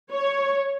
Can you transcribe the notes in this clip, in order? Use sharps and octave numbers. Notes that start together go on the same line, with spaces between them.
C#5